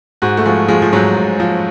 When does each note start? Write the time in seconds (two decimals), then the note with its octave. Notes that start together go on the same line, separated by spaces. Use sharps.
0.22 G#2 F#4
0.37 A3
0.45 F3 G#3
0.68 F3 G#3
0.82 F3
0.92 G#2 F#3
1.16 G#2
1.40 F3